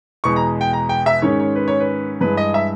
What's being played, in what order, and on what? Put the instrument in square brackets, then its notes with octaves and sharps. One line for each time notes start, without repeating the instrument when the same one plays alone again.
[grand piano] E2 B2 G#3 C#6
A#5
G5
A#5
G5
E5
G#2 D#3 G#3 C#4 C#5
C#5
B4
C#5
B4
G2 E3 G#3 B4
D#5
E5